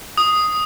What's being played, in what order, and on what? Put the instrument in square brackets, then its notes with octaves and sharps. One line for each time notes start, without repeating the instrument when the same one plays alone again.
[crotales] D#6